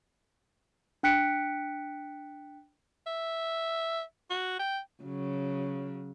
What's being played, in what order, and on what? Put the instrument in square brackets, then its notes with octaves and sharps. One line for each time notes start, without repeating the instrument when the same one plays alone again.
[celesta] D4 G5 F#6 B6 C#7 D7
[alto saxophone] E5
F#4
G5
[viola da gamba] C#3 F#3